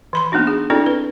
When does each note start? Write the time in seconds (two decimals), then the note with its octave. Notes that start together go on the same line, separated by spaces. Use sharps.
0.13 E3 B5 C6
0.32 A#3 B3 D4 D#4 F#4
0.47 G#4
0.70 C4 D4 E4 F#4 A4 D5
0.86 B4